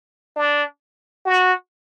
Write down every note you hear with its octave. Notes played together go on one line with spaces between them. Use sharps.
D4
F#4